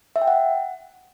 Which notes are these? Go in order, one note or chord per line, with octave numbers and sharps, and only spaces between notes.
E5
G5
F#5